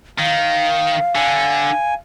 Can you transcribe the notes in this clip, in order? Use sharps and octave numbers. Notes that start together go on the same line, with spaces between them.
D#3 F5
D3 G#5